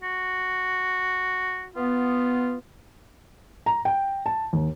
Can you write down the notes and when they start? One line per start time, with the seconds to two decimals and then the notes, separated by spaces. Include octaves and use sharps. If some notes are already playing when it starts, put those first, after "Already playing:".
0.03 F#4
1.76 B3 F4
3.66 A#5
3.85 G5
4.26 A5
4.53 D#2